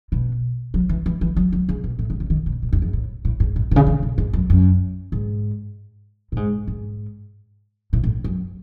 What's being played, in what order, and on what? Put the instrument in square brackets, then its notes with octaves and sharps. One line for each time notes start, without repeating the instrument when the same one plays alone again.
[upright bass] B2
F#3
E3
E3
E3
F#3
F#3
C#3
B2
A2
C#3
C#3
D#3
B2
A2
F#2
E2
A2
A2
G#2
A2
B2
C#3
D#3
B2
G#2
F#2
F#2
G#2
A2
G#2
G#2
A2
A2
F#2